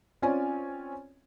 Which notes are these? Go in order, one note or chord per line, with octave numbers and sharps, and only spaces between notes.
C4 C#4 F4 C#5 D5 G#5